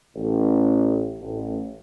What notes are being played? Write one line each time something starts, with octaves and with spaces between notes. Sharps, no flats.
A1
A1